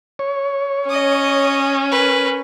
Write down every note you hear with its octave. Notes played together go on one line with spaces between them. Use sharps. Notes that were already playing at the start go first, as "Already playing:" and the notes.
C#5
C#4 D#5 D#6
A#4 B4